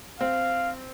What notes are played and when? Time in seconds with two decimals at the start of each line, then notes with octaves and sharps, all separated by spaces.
0.21 C4 F5